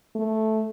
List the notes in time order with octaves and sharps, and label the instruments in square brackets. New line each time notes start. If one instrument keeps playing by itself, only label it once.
[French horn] A3